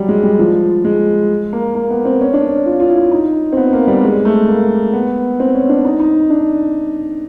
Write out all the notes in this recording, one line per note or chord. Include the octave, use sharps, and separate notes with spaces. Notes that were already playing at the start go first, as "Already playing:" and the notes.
Already playing: F#3 G3
G#3
G3
F3
G#3
A#3
A#3
B3
C4
C#4
D4
C#4
F4
F4
E4
D#4
C4
B3
A#3
G3
G#3
A3
A#3
B3
C4
C#4
D4
D#4
D#4
D4